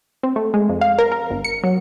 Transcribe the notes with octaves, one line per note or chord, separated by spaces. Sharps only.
C4
A3
G#3
F2
F5
A#4
A#4
G1
C#7
F#3